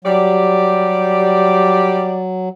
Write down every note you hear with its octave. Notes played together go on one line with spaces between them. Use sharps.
F#3 G3 G4 D5